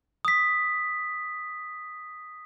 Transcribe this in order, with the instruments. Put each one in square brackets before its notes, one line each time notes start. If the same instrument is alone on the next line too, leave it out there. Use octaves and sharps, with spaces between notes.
[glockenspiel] D#6 B6